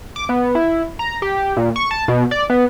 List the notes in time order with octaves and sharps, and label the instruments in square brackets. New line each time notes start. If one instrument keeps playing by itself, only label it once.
[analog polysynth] D6
B3
E4
A#5
G4
A#2
C#6
A5
B2
D5
B3